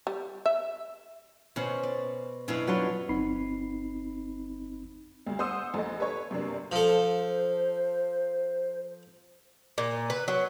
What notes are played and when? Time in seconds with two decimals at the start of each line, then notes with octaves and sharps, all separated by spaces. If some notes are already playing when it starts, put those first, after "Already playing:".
0.07 G3
0.46 E5
1.56 B2 C#4 C5 F#5
1.83 D5
2.48 F#2 B2 D4 E4 B4 F5
2.67 F#3 D4 F4 B4 C#5 C6
3.09 G1 C4 D#4 B5 C7
5.27 D2 G2
5.39 C5 F#5 C6 D#6 E6
5.74 A#1 A3 D#5
5.98 A4 B4 C#5
6.31 F#2 C3 A#3 D4
6.72 F3 A4 C5
9.78 A#2
10.10 B4
10.28 F#3